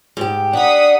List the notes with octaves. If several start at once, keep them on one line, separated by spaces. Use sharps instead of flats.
G#2 G4
D4 F#5 A#5 D#6 B6